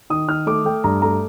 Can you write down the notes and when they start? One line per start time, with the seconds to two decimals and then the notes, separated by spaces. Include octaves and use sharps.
0.10 D#3 D#6
0.28 D#3 F6
0.47 A3 D6
0.65 A3 G5
0.84 G2 A#5
1.02 A3 A#5